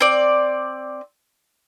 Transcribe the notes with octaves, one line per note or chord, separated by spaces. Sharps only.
C4 D5